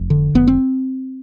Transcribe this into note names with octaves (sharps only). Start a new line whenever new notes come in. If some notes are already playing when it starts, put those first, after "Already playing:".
Already playing: F1
D3
F1 B3
C4